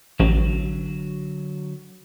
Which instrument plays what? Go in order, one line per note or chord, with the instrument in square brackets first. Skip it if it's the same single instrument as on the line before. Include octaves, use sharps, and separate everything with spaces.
[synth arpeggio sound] A1 [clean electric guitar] D3 F#3